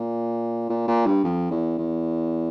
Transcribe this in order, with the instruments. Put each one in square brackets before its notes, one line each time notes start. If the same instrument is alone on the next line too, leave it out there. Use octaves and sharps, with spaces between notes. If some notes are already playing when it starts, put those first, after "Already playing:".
Already playing: [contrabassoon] A#2
A#2
A#2
G2
F2
E2
E2